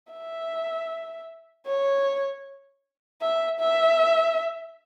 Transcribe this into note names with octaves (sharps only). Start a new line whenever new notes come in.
E5
C#5
E5
E5